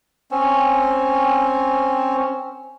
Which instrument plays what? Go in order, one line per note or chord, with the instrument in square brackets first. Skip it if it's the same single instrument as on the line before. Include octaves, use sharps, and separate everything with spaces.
[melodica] C4 C#4